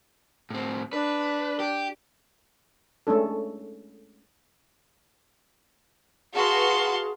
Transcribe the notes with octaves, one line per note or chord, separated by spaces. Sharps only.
A2 C4
D4 B4
G4
G#3 A3 C#4 D4 A4
F#4 G#4 B4 F5 A5 C6